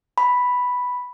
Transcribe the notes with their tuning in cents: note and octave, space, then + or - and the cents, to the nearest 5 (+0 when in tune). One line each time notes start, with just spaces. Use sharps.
B5 +0